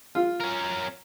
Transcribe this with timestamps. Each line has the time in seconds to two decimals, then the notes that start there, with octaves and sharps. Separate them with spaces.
0.15 F4
0.41 C#4 A#4